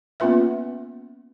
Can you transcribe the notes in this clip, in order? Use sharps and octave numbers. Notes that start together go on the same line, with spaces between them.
A#3 B3 C#4 F4 B4 E5